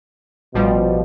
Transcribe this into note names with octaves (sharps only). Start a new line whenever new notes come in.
A1 B2 F3 G3